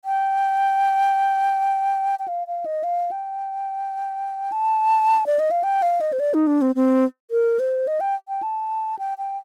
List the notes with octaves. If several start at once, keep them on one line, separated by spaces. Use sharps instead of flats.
G5
G5
F5
F5
D#5
F5
G5
A5
D5
D#5
F5
G5
F5
D#5
C5
D5
D#4
D4
C4
C4
A#4
C5
D#5
G5
G5
A5
G5
G5